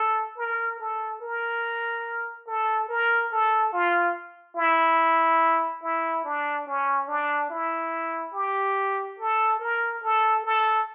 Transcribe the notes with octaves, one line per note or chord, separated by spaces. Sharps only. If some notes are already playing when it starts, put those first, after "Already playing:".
Already playing: A4
A#4
A4
A#4
A4
A#4
A4
F4
E4
E4
D4
C#4
D4
E4
G4
A4
A#4
A4
A4